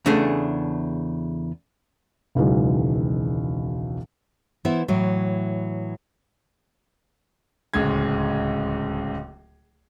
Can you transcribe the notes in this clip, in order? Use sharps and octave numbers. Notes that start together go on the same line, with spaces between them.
E2 C#3 A3 D4 G#4 E5
E1 C#2 D#3 E3 F#3 G#3
E3 B3 E4 C5
A2 E3 F#3
D1 C#2 C#3 G#3 G#6